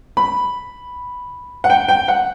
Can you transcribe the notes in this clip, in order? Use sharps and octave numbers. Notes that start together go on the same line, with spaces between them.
B5
F#5
G5
G5
F#5